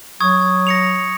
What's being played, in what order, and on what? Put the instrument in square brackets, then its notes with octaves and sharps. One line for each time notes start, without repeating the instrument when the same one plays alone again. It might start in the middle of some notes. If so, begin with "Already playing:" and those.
[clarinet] F#3 [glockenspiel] C#6 D#6 G#6
[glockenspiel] A#6 C#7 F7